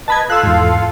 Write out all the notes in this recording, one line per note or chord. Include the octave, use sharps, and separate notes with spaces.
B4 D#5 A5 B5 G#6
F4 A4 F5 E6 F#6
E2 G#2